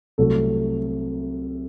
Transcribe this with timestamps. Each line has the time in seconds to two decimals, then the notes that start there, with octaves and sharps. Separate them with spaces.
0.18 C2 C3 F#3 A3 A4